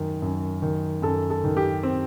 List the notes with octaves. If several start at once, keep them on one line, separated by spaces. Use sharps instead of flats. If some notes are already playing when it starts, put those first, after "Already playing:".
Already playing: F#2 D#3
F#2
D#3
F#2 A4
A4
D#3
G4
C4